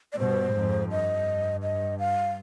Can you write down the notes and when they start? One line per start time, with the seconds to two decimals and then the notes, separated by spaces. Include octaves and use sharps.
0.13 D5
0.19 G2 B2 C5
0.54 F2 G#2
0.91 G2 D#5
1.63 D#5
1.99 F5